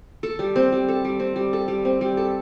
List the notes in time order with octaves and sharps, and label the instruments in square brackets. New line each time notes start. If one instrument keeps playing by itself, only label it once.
[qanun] A4
G3
C4
G3
A4
G3
C4
G3
A4
G3
C4
G3
A4